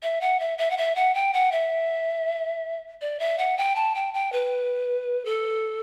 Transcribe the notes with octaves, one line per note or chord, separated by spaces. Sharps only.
E5
F#5
E5
E5
F#5
E5
F#5
G5
F#5
E5
D5
E5
F#5
G5
A5
G5
G5
B4
A4